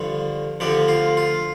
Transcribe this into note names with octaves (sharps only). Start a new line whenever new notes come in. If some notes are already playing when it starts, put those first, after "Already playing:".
Already playing: G2 D3 F3
D2 D3 F3 G4
F4
F4